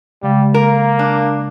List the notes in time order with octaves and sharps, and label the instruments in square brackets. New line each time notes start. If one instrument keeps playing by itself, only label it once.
[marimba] C#3 G#3 F5 [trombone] G3
[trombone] A#3 [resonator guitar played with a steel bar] A#4
[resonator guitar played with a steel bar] D4